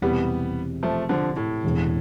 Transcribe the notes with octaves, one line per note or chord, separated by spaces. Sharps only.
E1 E2 C3 E3 G3 B3
F3 A3
D3 F3
A2
E1 E2 C3